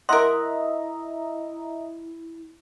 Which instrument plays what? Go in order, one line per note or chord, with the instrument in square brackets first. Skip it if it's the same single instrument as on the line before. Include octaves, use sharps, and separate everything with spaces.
[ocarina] E4 [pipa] A#4 F#5 [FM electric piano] D#5 E5 A#5 [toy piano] C6